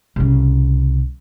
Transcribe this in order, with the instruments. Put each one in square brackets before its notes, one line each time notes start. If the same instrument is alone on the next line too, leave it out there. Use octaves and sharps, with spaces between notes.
[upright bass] C2 C#3